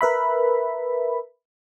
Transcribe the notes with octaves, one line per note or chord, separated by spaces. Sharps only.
A#4 B4 E5 B5